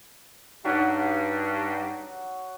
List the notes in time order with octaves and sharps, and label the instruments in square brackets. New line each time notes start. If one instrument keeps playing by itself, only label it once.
[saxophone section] G2 [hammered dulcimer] F#3 F#5 [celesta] D#4